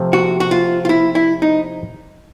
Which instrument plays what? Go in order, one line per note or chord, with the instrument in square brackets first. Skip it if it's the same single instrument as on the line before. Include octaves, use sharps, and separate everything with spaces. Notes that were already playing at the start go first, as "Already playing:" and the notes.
Already playing: [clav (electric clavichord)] C3 F3 A3
[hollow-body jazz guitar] F#4
F#4
F4
F4
E4
E4
D#4